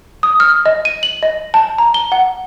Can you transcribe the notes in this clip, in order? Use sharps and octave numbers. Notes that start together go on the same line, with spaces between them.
D#6
F6
D#5
D#7
F#7
D#5
A5
A#5
G7
F#5